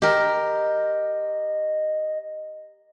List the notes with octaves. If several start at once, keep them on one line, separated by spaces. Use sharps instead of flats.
G4 A#4 D#5